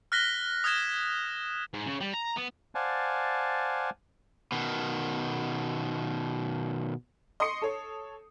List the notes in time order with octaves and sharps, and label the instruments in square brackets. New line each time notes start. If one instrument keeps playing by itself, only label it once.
[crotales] F6 F#6 A#6 B6 G7
D#6 F6 G#6 A#6 E7
[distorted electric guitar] G#2
C#3
G3
A#5
B3
[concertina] C5 D5 F5 F#5 G#5 A5
[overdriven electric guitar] B2 D#3
[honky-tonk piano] D#5 C6 C#6 D#6 C7 C#7
A4 C#5